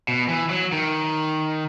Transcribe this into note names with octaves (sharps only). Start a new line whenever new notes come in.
B2
E3
F#3
D#3